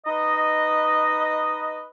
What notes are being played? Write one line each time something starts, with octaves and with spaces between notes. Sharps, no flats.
D#4 B4 D#5